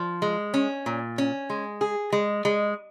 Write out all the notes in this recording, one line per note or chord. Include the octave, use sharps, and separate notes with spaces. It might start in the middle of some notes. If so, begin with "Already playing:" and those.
Already playing: F3
G#3
C#4
A#2
C#4
G#3
G#4
G#3
G#3